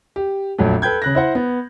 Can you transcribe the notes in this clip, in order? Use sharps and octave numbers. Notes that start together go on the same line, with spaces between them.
G4
A#1 F2 F#3 A3
A4 B4 G5 G6 G#6
C#3 F#6 A#6
E4 C5 F#5
B3